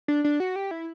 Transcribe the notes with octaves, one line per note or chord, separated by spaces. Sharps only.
D4
D4
F#4
G4
E4